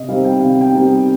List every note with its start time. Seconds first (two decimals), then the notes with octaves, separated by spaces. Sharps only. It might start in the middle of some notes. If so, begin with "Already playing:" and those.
Already playing: C3 D#5
0.09 G3 C4 D#4 F5
0.25 G5
0.40 C3 F5
0.61 G5
0.72 G3 C4 D#4